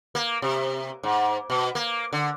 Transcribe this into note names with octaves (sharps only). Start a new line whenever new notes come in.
A#3
C3
G#2
B2
A#3
D3